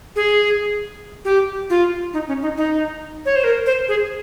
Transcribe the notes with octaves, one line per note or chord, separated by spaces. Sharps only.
G#4
G4
F4
D#4
C#4
D#4
D#4
C#5
C5
A#4
C5
G#4